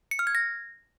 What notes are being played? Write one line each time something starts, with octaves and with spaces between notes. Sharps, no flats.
C#7
F6
G#6
A#6